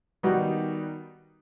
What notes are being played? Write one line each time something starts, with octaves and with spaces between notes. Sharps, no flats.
D#3 G3 B3 D#4 F#4